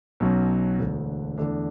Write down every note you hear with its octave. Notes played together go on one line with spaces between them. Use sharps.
B1 B2 F#3 C#4 F#4
E1 D2 D3
E2 D3 A3 D4